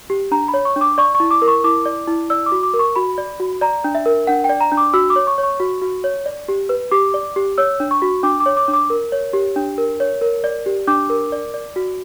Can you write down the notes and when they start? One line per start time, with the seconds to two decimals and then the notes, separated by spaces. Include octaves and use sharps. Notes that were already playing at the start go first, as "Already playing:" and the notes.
0.10 G4
0.31 D4 A#5
0.48 B5
0.54 C#5
0.65 C#6
0.76 D4
0.81 D6
0.98 D5 C#6
1.15 C#6
1.20 E4
1.31 D6
1.42 A#4
1.48 C#6
1.64 E4 D6
1.86 D5
2.08 E4
2.30 D5 E6
2.46 D6
2.52 F#4
2.63 D6
2.74 A#4
2.79 C#6
2.96 F#4 B5
3.18 D5
3.40 F#4
3.61 D5 A#5
3.84 D4
3.95 E5
4.06 A#4
4.27 D4 F#5
4.44 G5
4.49 D5
4.61 A#5
4.72 D4
4.77 D6
4.94 F#4 E6
5.10 D6
5.16 C#5
5.27 C#6
5.38 C#5
5.43 C#6
5.60 F#4
5.82 F#4
6.04 C#5
6.26 D5
6.48 G4
6.69 B4
6.91 G4 D6
7.14 D5
7.36 G4
7.58 C#5 E6
7.80 D4
7.91 C#6
8.02 F#4
8.23 D4 D6
8.40 D6
8.46 C#5
8.57 D6
8.68 D4
8.74 D6
8.90 A#4
9.12 C#5
9.33 G4
9.56 D4
9.78 A#4
10.00 C#5
10.21 A#4
10.44 D5
10.66 G4
10.87 D4 D6
11.10 A#4
11.32 D5
11.54 D5
11.76 F#4